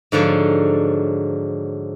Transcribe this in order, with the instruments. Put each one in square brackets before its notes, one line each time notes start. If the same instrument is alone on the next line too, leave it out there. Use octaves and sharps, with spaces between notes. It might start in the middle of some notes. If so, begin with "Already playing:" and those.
[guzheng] G#2 D3 F3 F#3